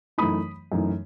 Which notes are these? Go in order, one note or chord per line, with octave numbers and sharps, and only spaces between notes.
F#2 E3 A3 D#4 B5 D#6
F#2 E3 A3 D#4